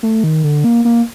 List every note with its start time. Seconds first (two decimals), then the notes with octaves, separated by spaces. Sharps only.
0.03 A3
0.24 D#3
0.44 D3
0.64 A#3
0.85 A#3